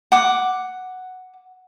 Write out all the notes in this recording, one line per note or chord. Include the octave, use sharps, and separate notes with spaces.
F#5 D6